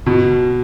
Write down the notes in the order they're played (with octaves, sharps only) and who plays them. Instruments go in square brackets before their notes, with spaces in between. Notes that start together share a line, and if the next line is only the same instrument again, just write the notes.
[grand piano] B2